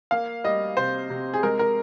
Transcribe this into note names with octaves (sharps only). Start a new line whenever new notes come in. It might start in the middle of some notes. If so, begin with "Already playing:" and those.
A#3 F5
G3 D#5
C3 C5
C3
G#4
G#3 A#4
A#4